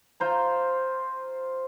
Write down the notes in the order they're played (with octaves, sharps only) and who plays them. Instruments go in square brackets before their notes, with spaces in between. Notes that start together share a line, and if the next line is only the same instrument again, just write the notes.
[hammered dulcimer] F4 C5 A#5